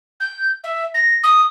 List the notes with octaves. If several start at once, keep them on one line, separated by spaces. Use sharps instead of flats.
G6
E5
A#6
D#6